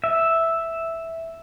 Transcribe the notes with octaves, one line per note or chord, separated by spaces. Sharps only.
E5